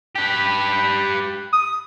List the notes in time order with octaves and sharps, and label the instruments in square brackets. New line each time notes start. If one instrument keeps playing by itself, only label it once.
[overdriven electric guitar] G4 B4
[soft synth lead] D#6